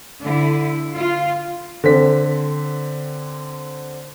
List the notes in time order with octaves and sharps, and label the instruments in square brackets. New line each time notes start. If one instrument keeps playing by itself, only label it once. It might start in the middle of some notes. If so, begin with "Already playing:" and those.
[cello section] D3 E4
F4
[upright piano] D3 C4 B6